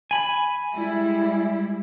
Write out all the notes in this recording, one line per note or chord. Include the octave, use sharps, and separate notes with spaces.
G#5 B5
G3 G#3 E4